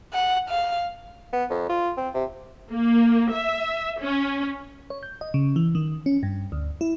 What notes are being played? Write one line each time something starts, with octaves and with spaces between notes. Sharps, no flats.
F#5
F5
B3
F2
F4
C4
C3
A#3
E5
C#4
C#5
G6
D#5
C#3
E3
D#3
C#4
G2
D2
E4